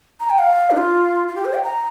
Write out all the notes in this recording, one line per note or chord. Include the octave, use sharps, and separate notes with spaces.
A#5
G5
F5
D4
F4
F4
G4
C5
G5
A#5